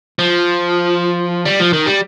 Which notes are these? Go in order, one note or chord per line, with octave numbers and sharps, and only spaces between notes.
F3
G3
F3
D#3
G3